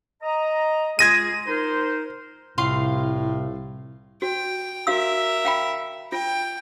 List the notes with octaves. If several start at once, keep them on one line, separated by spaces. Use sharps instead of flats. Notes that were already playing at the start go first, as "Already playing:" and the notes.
D#5 A#5
G#3 F4 G#4 G#6 A#6 D#7
D#4 A#4 C5
C2 A2 C3 F4 F5 C6
F#4 G5
F#4 A#4 E5 F5 E6
F5 G5 B5
F4 G5